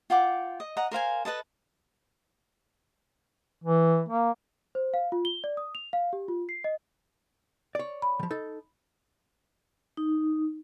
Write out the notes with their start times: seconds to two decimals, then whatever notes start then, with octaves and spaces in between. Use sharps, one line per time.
0.10 F4 F#5 G5 D6
0.60 D#5
0.77 D#5 F#5 A#5
0.91 A#4 C5 F5 G#5
1.25 A4 B4 D#5 A5
3.64 E3
4.09 A#3
4.75 C5
4.94 F5
5.12 F4
5.25 G7
5.44 D5
5.57 D#6
5.75 F7
5.93 F5
6.13 G4
6.28 F4
6.49 C7
6.64 D#5
7.75 C#5 D5
8.02 B5
8.19 D#3 F3
8.30 D#4 A4
9.97 D#4